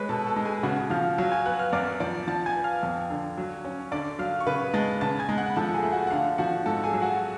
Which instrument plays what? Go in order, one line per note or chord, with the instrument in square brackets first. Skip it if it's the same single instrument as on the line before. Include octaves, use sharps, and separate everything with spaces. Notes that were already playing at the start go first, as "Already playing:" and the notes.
Already playing: [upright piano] G#3 [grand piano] B4 C#5 B5
[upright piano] B2 [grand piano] A4 A5
[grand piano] A4 A5
[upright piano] G#3
[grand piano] G#4 G#5
[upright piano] C#3 [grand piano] F#4 F#5
[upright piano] F3 [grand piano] F5 F6
[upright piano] F#3 [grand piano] F5 F6
[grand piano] G#5 G#6
[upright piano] B3 [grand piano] F#5 F#6
[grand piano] F5 F6
[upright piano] F#2 [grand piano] D5 D6
[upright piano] F3 [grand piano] D5 D6
[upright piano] F3 [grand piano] A5 A6
[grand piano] G#5 G#6
[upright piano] B3
[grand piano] F5 F6
[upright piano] F2
D3
F#3
C#4
[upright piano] D3 [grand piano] D5 D6
[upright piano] F#3 [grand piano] F5 F6
[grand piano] C#6
[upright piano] C#3 [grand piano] B4 B5
[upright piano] G#3 [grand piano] A5 A6
[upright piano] C#3 [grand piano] A5 A6
[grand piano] G#5 G#6
[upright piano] G#3
[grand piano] F#5 F#6
B5
[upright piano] F3 [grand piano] A4 A5
[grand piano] G#4 G#5
[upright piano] A3
[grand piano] F#4 F#5
F#5
[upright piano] D3 [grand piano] F5
[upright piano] F3 [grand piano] F#4 F#5
[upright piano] G#2 [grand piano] A4 A5
[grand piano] G#4 G#5
[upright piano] F#3
[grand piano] F#4 F#5